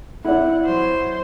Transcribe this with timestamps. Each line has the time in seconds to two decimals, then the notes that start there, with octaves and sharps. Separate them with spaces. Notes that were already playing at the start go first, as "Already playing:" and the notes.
0.25 C4 E4 D5 F#5
0.66 F#3 C5